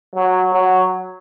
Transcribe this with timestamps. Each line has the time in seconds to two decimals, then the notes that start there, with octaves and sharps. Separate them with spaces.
0.15 F#3
0.53 F#3